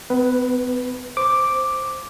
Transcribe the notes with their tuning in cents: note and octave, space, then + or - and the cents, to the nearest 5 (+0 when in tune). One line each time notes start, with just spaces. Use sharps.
B3 +40 B4 +0
C5 +0 D6 +0